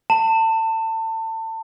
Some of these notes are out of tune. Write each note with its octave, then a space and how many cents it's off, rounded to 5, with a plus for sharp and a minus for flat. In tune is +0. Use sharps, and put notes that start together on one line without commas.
A5 +30